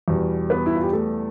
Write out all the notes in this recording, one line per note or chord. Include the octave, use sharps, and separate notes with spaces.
E2 B2 G3
B3 B4
E4
F4
G4
A3 A4